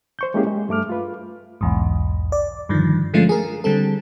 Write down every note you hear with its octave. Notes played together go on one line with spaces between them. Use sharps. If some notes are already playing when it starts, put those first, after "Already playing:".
C5 C#6 G6
G#3 A#3 C#4 E4 G4 G#4
G#3
G2 A3 D6 F6
F4 B4
B1 E2 G#2
D5
G2 D3 D#3 F3
D3 F3 G#3 A3 C#4 F4
G#4 A#4
D3 G3 C4 A4